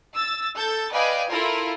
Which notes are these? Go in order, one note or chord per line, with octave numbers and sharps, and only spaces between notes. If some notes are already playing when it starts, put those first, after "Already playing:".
E6 A6
A4 G6 A6
B4 D5 D#5 F5 G5 G#5
E4 F4 A4 A#4